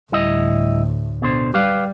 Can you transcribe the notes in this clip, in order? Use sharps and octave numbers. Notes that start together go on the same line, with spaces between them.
D2 A2 G3 E4 D#5
B2 D3 C5
G3 G4 B4 F5